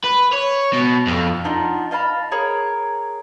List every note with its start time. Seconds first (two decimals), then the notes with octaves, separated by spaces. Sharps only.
0.04 B4
0.33 C#5
0.73 B2
1.07 F2
1.44 D4 D#4 F4 F#5
1.91 D#5 F5 A5 B5
2.32 G#4 A#4 C#5